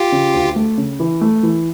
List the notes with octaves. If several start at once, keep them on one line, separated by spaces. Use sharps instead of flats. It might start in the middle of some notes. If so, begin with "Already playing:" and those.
Already playing: F4 G4
C#3
D2
A3
C#3
E3
A3
E3